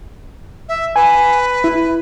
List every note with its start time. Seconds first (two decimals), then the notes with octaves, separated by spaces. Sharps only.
0.69 E5
0.96 B4 G#5
1.64 E4